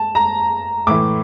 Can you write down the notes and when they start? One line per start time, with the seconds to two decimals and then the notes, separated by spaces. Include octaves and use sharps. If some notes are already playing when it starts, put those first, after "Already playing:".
Already playing: A5
0.15 A#5
0.87 A2 E3 D6